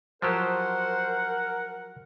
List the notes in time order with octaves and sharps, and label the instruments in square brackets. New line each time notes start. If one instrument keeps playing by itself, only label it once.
[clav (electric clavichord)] F3 F#3 G4 [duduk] A#4 [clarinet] C5 [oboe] F#5